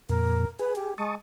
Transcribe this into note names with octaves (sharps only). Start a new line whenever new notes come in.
F2 A#2 A#4
G#4 B4
G4
G#3 A5 C#6 D#6